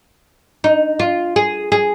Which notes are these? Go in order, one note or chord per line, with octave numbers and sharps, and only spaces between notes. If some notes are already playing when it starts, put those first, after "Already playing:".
D#4
F4
G#4
G#4